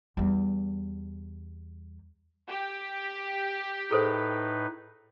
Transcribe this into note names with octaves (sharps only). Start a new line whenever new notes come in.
E2 G3
G4
A2 D#4 G#4 A4 B4 C5